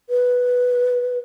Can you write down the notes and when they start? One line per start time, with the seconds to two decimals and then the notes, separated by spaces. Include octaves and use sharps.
0.10 B4